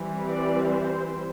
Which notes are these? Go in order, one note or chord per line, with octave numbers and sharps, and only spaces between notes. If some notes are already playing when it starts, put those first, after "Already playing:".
Already playing: E3 G3 C4
D5
C5